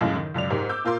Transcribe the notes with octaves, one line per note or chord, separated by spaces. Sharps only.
C#2 F#2 A2 C#3 G#3
D#3
C#2 F#2 D5 F7
G#2 G4 A#4
D6 E6 G6
A#2 F4 A#4 C6